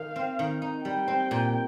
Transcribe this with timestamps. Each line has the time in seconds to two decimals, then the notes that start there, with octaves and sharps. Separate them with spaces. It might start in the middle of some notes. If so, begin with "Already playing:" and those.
Already playing: D#3 F5
0.16 C4
0.39 D#3
0.62 D#4
0.84 G3 G5
1.08 C4
1.31 A#2